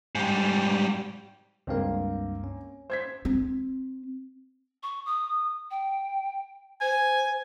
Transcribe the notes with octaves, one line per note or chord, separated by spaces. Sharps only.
G#2 G3
C#2 G2 A#3 C4 F5
C#4
C5 G#6 B6
C4
C#6
D#6
G5
C5 G#5